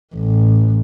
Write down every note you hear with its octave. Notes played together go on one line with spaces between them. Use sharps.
A1